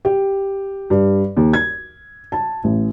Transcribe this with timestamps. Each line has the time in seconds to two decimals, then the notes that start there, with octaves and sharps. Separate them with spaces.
0.05 G4
0.90 G2
1.37 D#2
1.53 G#6
2.32 A5
2.64 A1